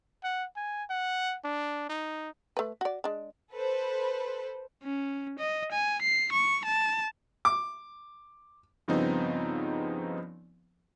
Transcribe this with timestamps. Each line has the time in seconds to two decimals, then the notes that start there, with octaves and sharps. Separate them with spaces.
0.24 F#5
0.56 G#5
0.90 F#5
1.44 D4
1.90 D#4
2.57 A3 B4
2.81 F#4 D5
3.04 G#3 D4
3.52 A4 B4 C5
4.83 C#4
5.39 D#5
5.72 G#5
6.02 C7
6.32 C#6
6.65 A5
7.45 D6
8.88 G2 C#3 F3 B3 C4 D#4